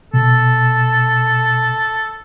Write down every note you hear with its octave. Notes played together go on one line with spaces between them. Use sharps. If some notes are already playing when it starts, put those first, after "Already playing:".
B2 A4